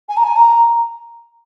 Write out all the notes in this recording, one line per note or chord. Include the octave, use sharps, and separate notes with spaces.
G#5
A#5
G#5
A#5